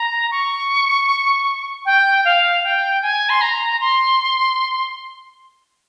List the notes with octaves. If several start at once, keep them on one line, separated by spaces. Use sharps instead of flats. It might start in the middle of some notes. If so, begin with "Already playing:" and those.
Already playing: A#5
C#6
G5
F5
G5
G#5
C6
A#5
C6